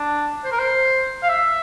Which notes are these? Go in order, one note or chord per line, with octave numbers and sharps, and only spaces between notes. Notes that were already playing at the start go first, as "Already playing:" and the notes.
Already playing: D4
C5
A#4
C5
F5
E5